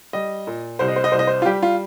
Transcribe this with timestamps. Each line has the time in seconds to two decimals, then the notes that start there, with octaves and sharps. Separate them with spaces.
0.13 G3 D#5
0.47 A#2
0.79 C2 C5
0.88 D#5
0.96 C5
1.04 D#5
1.12 C2 C5
1.19 D#5
1.27 C5
1.42 F4
1.46 G3 G4
1.62 F4